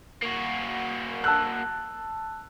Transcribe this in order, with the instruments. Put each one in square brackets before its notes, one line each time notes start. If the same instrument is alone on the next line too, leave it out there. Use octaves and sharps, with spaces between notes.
[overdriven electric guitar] A#3 F#4
[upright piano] A5 E6 F#6